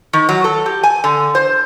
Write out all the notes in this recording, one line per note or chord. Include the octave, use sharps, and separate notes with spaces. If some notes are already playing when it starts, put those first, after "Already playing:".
D#3
F#3
A4
G4
G#5
D3
C5